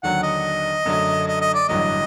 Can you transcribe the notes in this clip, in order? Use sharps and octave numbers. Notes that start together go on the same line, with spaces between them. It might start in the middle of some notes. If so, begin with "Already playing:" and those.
D#2 D3 F#3 F#5
D#5
F#2 D3 F#3 A3
D#5
D#5
D5
A1 G2 D3 F#3 D#5